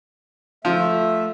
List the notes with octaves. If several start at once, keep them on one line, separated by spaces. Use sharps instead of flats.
F3 A3 E5